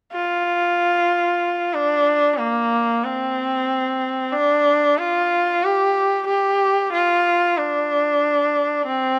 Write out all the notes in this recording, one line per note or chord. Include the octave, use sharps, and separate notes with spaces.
F4
D4
A#3
C4
D4
F4
G4
G4
F4
D4
C4